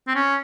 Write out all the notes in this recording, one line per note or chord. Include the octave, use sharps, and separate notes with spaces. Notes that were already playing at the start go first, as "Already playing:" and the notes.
C4
C#4